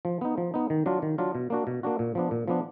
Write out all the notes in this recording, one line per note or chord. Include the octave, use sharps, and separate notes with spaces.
F3
B3 D#4
F3
B3 D#4
D#3
F#3 D4 F4
D#3
F#3 D4 F4
B2
A#3 D4 F#4
B2
A#3 D4 F#4
A#2
F3 B3 D4
A#2
F3 B3 D4